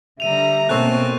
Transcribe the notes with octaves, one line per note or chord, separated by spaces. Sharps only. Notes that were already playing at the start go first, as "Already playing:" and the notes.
D3 G3 E5 A#5 D#7 F7
B2 A3 A#3 C4 C#4 C#6 F#6